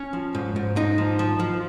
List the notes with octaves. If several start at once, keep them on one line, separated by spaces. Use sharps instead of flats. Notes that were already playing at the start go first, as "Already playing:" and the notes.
Already playing: C#4
F3
G#2
G#2
G#2 D#4
F3
F3
F3